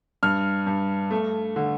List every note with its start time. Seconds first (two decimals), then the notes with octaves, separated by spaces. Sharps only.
0.23 G2 F6
0.67 G2
1.11 A3
1.56 D3